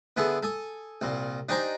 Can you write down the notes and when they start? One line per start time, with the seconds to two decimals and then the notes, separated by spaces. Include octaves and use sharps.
0.17 D3 B3 E4 G#4 A4
0.43 A4 G#5 D#6
1.01 C2 A#2
1.49 D4 D#4 G4 C5 G#5 A#5